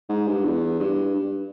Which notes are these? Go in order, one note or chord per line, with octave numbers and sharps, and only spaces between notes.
G#2
G2
E2
G2
G2